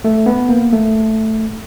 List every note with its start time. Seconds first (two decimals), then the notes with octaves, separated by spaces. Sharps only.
0.04 A3
0.26 B3
0.49 A#3
0.73 A3